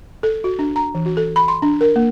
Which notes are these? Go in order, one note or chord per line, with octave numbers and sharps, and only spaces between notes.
A4
F#4
D4
A#5
E3
F#4
A4
B5
C6
D4
A#4
A#3